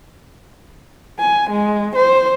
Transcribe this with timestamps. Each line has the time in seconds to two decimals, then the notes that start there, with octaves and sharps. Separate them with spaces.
1.19 G#5
1.50 G#3
1.96 C5